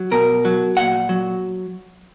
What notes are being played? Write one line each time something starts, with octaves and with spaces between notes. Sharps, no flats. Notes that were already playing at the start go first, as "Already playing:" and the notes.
Already playing: F#3
B2 A#4
F#3
A#2 F#5
F#3